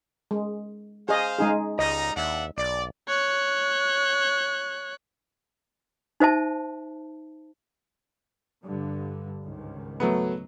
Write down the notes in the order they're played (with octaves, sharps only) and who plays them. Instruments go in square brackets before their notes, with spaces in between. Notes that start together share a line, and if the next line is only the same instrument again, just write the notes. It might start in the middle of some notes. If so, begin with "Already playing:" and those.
[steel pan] G#3
[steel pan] G#4 D#5 [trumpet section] C5 F5
[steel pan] G#3 D#4 G#4
[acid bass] C#2 [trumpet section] G3 D#4 A#5 [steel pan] D#5
[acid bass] D#2 [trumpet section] D4 E5 F#5
[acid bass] B1 [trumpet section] D5
[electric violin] C#5 F#6
[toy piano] D#4 C5 E5 A5
[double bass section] G2 D3
C#2 G#2 D#3
[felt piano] F#3 A3 B3